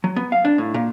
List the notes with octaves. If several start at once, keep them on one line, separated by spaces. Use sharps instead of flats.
F#3
B3
F5
D4
A2
A#2